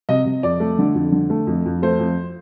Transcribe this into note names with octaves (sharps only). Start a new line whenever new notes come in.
C3 D#5
C3
F2 D5
A3
D3
F2
D3
A3
F2
F2
A3 C5
F2